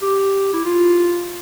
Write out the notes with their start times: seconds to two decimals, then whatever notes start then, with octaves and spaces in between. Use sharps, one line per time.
0.02 G4
0.53 E4
0.65 F4